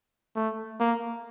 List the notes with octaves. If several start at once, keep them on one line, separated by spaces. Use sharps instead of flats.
A3
A#3